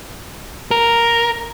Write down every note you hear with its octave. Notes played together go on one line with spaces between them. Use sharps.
A#4